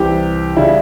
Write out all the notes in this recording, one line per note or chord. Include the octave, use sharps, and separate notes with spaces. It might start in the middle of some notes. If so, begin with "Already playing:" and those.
Already playing: C2 C3 E3 G4
C#3 G3 E4